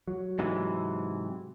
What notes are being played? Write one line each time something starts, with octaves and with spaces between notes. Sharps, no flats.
F#3
G#2 C3 E3